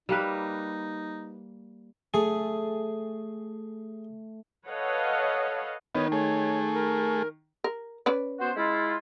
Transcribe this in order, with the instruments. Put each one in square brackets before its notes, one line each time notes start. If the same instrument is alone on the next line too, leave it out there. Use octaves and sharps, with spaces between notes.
[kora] G3 A#3 B4 [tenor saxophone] D#4
[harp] A3 [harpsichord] G#4
[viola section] A4 B4 C#5 D#5 F5 F#5
[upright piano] D#3 [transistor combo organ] B3 D#4 [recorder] C#5
[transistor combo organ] A3 G#4 [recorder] C#5
[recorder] A#4
[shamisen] A#4
C#4 B4 D5
[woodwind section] B3 F#4 C5
G#3 E4 F4